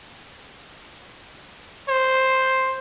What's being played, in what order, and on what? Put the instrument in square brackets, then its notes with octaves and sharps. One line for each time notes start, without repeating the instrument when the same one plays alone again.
[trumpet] C5